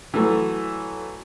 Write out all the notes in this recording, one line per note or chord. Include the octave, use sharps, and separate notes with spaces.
E3 F#3 A3